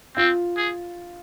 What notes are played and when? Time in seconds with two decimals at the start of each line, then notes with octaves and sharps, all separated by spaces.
0.17 C4 F4
0.57 G#4